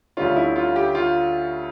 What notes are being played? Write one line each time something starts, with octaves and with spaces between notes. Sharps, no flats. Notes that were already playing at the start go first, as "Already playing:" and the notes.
D2 D3 G3 C#4 F4
E4
F4
G4
F4